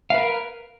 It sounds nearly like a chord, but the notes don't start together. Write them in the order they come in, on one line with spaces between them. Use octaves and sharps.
F5 B4 A#4